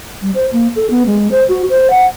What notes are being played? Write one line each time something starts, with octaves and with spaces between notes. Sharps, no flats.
G3
C5
A#3
A4
B3
G#3
C5
F#4
C5
F#5